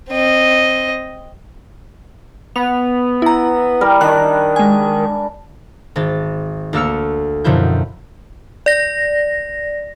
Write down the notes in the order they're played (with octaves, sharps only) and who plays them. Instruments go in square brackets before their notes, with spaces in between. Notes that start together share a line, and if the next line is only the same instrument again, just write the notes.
[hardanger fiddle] C4 D#5
[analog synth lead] B3 [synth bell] F7
[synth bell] E4 A#5
[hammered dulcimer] G3 A#4
[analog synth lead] D#3 [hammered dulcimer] D4 [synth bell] F#6
[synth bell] G#3 G#5
[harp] G#1 A6
D2 A#3 A4 E6 F6 C#7
F#2 B2 D3 F3 E4 G6
[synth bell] D5 A#6